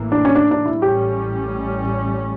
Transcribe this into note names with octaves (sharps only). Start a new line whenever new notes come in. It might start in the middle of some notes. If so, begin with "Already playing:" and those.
Already playing: A1 A2 E3 A#3
D4
C#4
D4
D4
E4
A1 A2 G3 C#4 G4